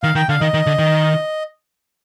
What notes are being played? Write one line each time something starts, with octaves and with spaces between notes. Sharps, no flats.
D#3 F5
D#3 G5
D3 F5
D#3 D#5
D#3
D3
D#3